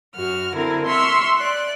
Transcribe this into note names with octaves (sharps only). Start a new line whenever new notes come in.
F#2 F#4 F6
D3 C4 E4 A#4
E5 C6 C#6 E6 F6
D5 F#6